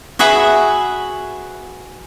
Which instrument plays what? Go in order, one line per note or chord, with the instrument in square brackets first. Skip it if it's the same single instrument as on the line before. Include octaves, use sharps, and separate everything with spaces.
[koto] F#4 G#4 B4 E5 F#5